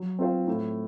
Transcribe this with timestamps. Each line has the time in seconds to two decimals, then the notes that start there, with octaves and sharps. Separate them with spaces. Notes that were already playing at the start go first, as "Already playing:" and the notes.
Already playing: F#3
0.19 C4 F4 C5
0.47 A2